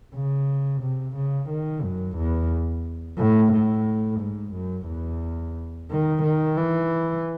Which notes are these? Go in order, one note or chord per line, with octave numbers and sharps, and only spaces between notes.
C#3
C3
C#3
D#3
F#2
E2
A2
A2
G#2
F#2
E2
D#3
D#3
E3